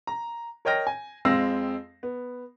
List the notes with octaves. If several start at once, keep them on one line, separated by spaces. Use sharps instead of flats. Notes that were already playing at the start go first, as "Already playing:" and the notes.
A#5
A#4 C#5 D#5 G5 F6 A#6
G#5
F2 G#3 C4 F5 E6 A#6
B3